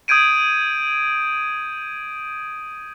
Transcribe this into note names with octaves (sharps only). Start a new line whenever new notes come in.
D#6 G6 G#6 D7 D#7